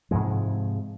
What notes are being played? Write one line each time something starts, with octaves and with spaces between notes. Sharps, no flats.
G#2 C3 F3 G#3